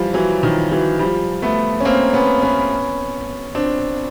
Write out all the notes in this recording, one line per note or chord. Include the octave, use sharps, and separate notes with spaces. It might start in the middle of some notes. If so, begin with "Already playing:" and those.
Already playing: E3 F3 G3
E3 F#3
D#3 F3
E3 F#3
F3 G3
A3 B3
C#4
A#3 C4
B3 C#4
B3 C#4
C4 D4